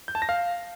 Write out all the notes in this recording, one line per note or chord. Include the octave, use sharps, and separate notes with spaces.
G6
A5
A#6
F5